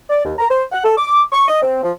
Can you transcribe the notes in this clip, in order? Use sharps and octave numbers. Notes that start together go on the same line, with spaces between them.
D5
D#2
A#5
C5
F#5
A4
D6
C#6
D#5
C4
F3